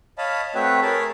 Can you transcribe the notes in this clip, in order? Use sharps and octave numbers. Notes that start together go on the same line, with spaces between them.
C#5 D#5 F5 A5 B5
A3 C4 F#4 B4 C#5 E5
G#4 A#4 C#5 A5 B5